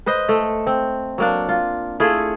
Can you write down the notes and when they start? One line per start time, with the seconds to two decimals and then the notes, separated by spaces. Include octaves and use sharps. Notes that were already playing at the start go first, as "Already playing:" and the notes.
0.06 B4 C5 D#5
0.29 A3
0.67 C4
1.18 F#3 A#3 D4
1.49 F4
2.00 A3 E4 F4 G#4